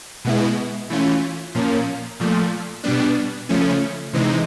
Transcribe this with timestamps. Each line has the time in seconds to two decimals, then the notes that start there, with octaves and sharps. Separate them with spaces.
0.25 B2 G#3 B3 E4
0.90 E3 A3 C#4 F4
1.55 A#2 F3 A#3 C#4
2.20 A#2 F3 A3
2.84 B2 G3 B3 D4
3.49 C#3 F3 A3 C#4
4.13 C3 E3 G#3 C4 D#4